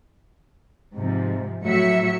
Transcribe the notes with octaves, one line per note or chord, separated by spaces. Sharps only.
G#2 C3 F3
A2 F#3 F#4 E5 C#7